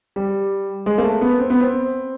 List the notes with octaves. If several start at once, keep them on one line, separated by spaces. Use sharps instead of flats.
G3
G#3
A#3
A3
B3
C4
B3
C4